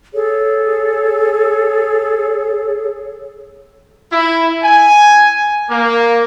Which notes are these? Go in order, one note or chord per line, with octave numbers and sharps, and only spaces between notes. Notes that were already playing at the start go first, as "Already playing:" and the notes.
G#4 A4 C#5
E4
G#5
A#3